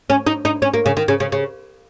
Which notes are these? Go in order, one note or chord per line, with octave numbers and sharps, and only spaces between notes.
C#4
D#4
D#4
C#4
A#3
C#3
D#3
C#3
C#3
C#3